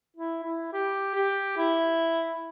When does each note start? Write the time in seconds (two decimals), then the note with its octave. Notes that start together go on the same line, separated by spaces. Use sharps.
0.16 E4
0.44 E4
0.73 G4
1.15 G4
1.57 E4